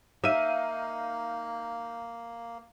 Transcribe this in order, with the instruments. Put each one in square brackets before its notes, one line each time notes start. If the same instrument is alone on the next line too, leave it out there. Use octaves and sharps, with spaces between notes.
[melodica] A#3 [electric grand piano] D#4 F5 D#7 [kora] E5